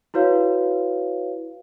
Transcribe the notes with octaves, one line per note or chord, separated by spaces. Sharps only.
E4 F#4 B4 C#5 F5